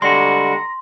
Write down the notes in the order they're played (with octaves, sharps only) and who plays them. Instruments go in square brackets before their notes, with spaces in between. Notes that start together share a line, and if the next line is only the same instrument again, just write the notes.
[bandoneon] D3 G3 [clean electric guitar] G#3 F#4 [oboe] A#5 [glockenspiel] C6